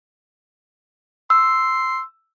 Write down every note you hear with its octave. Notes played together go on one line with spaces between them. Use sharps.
C6 E6